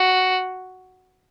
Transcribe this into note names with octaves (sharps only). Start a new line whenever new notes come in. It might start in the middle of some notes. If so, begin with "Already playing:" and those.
Already playing: F#4